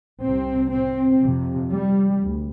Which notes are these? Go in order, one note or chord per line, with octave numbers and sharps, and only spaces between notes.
C2 C3 C4
C4
F2 C3
G3
D2